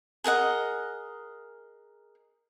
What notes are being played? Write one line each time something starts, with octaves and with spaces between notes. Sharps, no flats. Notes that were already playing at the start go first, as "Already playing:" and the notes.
G#4 A#4 D#5 F#5